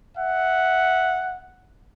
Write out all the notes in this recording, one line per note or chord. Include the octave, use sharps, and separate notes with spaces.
E5 F#5